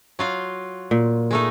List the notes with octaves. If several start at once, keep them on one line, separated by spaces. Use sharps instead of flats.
F#3 F4 F5
A#2
G#3 A3 D#4